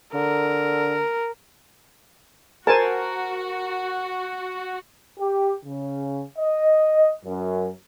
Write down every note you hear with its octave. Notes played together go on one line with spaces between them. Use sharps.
D3 A#4
F#4 A#4 C5 G#5 A5
G4
C#3
D#5
F#2